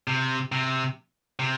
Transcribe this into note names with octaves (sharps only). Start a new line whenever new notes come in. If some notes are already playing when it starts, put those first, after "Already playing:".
C3
C3
C3